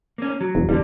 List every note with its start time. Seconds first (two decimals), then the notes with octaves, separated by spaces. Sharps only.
0.18 A#3 C#4
0.41 F#3
0.55 E1
0.69 E1 D3 G3